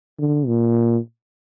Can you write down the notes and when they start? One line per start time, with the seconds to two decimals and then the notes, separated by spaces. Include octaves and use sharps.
0.19 D3
0.47 A#2